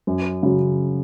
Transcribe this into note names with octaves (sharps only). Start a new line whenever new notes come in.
F#2
C#3 F#3